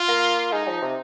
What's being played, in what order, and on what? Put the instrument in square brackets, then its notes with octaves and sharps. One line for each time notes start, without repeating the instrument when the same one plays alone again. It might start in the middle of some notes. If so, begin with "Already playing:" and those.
Already playing: [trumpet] F4
[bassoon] A#3
[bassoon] G#3 [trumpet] D#4
[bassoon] F3
C3